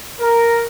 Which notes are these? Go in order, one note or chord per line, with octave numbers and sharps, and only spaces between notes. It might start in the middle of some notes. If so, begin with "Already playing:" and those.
A#4